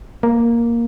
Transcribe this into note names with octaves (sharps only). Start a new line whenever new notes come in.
A#3